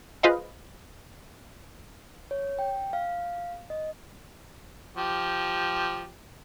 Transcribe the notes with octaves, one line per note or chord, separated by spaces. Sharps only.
F4 G#4 B4 C5 D#5 F5
C#5
G5
F5
D#5
F3 G4